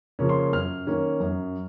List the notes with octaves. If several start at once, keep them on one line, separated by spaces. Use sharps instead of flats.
C#3 F3 A#3 C#4
C6
F#2 F6
D#3 A#3 C#4
F#2